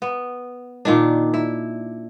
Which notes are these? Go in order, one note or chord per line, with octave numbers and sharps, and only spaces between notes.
B3
A#2 D#3 D4
E4